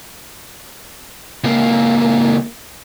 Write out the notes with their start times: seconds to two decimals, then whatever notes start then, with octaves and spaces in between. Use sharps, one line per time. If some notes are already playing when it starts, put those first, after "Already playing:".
1.44 C#2 A#3